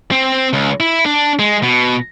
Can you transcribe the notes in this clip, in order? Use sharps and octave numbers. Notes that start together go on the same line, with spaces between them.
C4
C#2
E4
D4
G#3
B2